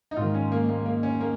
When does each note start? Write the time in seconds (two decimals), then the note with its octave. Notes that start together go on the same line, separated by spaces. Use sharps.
0.11 D#4
0.16 G#2 D#3 F4
0.34 C#4
0.52 A#3
0.69 A#3
0.86 A#3
1.03 C#4
1.20 A#3